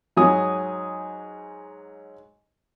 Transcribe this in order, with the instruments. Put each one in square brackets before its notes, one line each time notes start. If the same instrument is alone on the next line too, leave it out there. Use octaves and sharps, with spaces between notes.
[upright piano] G#2 F#3 G#5 D#6